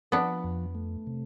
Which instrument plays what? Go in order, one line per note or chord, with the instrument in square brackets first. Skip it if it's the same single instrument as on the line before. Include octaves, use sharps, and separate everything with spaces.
[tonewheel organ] F3 [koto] B3 D4
[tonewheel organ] F2
A3
C3